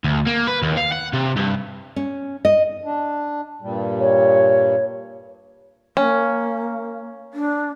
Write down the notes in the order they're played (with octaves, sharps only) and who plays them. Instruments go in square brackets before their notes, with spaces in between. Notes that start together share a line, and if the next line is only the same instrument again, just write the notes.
[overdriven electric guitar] D2
A#3
B4
D#2
F5
F#5
C3
G2
[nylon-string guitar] C#4
D#5
[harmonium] D4
G2 A#2 G3
[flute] C#5
[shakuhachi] A#3 [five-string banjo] C#4
[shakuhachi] D4